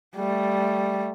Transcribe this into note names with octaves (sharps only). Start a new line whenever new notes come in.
G3 A3